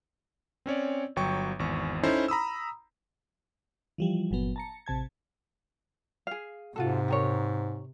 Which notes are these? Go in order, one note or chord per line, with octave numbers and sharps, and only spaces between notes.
C4 C#4 C#5 D5
G1 F#3 G5 C#6
G#1 E2 C#6
C#4 D#4 E4 A4 C5
A#5 B5 D#6 E6
E3 F3 G3
G1 A#2 F#3 B3
A5 A#5 C#7
A1 C3 A5 G#6
G#4 F5
G#2 C3 F4 F#4 A4
G4 A#4 C#5